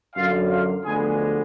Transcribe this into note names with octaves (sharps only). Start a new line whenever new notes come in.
F#2 D3 F#3 F4 F5
F4 F5
D2 D3 F3 G#3 B3 G#4 G#5